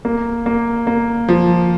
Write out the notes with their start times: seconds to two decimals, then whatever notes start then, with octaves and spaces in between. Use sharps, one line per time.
0.05 A#3
0.46 A#3
0.87 A#3
1.29 F3